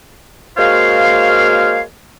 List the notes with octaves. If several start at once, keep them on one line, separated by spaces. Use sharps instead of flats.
G#3 A#3 F#4 C5 C#5 F5